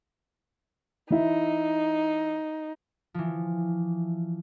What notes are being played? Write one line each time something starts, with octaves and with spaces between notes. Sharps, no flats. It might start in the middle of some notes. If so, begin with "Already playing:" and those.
E3 D#4 E4 E5
E3 F3